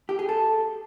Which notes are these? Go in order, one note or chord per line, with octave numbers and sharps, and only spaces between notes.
G4
G#4
A4